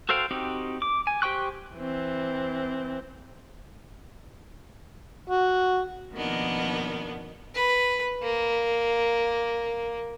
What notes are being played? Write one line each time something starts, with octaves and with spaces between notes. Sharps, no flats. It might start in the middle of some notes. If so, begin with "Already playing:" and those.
F#4 A4 C5 F5 G5
C4 D#4 F#4 G4
D6
G#5
G4 C5 G5 C#6 F#6
E3 C4
F#4
F2 B2 D#3 A#3 B3 D4
B4
A#3